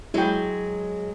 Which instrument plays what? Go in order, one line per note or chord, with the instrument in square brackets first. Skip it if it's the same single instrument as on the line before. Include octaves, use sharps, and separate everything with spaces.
[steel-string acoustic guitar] F#3 G#3 [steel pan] E4 G5